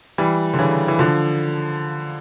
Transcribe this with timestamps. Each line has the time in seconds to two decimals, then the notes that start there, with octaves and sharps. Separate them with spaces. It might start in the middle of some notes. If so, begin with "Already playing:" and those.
0.18 E3 G3
0.54 D3
0.59 C#3 E3
0.88 E3
0.99 D3 F3